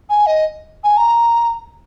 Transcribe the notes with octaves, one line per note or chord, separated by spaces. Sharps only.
G#5
D#5
G#5
A#5